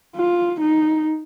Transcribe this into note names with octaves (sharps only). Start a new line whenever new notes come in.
F4
D#4